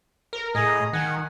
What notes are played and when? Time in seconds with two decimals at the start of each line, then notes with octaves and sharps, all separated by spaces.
0.33 A#4
0.55 A2 G#4 D#5 A#5
0.93 D#3 F#5 G#5